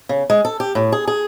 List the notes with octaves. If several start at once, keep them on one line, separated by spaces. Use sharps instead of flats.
C#3
G#3
A4
G4
A2
G#4
G#4